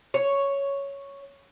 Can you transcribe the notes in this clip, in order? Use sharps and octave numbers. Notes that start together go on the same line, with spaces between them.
C#5